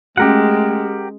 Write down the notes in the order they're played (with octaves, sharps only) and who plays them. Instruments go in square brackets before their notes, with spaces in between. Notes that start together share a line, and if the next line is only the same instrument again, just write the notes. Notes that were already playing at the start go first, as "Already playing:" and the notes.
[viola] G#3 [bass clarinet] A3 [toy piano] C#4 F#4 [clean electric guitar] G4 A#4 F#5